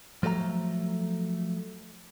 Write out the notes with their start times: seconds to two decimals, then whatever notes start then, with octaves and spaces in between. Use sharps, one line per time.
0.23 F3 F#3 A3 E5 A#5